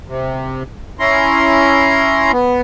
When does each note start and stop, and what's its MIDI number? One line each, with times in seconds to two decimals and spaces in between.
0.07 0.63 48
0.99 2.32 61
0.99 2.32 64
0.99 2.32 82
0.99 2.32 84
2.32 2.61 59